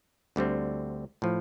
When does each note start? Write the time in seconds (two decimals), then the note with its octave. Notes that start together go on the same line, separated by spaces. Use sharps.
0.36 D2 D3 G3 C4
1.22 A2 F3